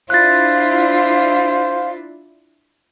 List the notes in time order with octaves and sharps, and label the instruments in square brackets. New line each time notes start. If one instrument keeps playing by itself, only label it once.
[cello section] D4 E4 F4 [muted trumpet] C5 [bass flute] F5 [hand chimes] F#6 A6